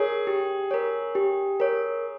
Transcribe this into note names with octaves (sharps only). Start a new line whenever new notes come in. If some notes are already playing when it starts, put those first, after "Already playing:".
Already playing: G#4 A#4 C#5
G4
A#4 C#5
G4
A#4 C#5